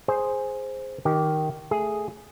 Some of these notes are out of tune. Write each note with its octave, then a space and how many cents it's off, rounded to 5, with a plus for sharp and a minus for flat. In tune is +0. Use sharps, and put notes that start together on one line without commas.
G#4 +0 C5 +0
D#3 +0 G4 -15
A3 +0 G#4 +0